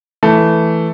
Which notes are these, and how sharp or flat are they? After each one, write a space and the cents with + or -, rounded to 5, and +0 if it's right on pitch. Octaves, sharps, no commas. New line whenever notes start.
E3 +0 A3 +0